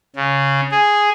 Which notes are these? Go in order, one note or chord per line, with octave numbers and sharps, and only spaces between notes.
C#3
G#4